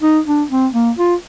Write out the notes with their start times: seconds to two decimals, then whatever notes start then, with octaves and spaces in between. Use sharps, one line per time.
0.03 D#4
0.27 D4
0.50 C4
0.74 A#3
0.98 F4